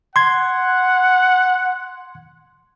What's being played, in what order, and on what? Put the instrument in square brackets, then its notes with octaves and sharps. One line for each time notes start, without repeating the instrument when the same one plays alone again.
[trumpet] F#5 [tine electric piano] C6 G#6